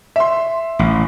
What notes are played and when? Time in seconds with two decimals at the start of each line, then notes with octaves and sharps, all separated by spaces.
0.16 E5 C6
0.79 A1